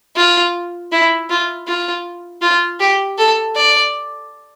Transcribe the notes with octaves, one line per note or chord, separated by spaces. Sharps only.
F4
E4
F4
F4
F4
G4
A4
D5